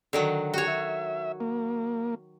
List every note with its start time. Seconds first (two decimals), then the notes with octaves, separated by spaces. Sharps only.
0.13 D3 D#3 F#3
0.54 F#4 G4 C#5
0.67 E5
1.40 A#3